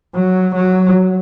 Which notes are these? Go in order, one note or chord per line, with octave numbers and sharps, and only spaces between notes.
F#3
F#3